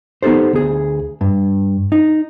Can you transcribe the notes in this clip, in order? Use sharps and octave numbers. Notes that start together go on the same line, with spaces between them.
B3 D#4 G4 A4 C5
D2 G#4
G2
D#4